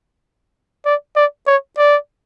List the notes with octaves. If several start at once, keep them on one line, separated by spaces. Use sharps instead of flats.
D5
D5
C#5
D5